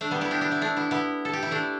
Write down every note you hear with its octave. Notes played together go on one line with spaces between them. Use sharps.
A3 D4
G3 B3
B3 E4
D4 G4
D4 G4
B3 E4
A3 D4
B3 E4
B3 E4
A4
G4
E4
A3 D4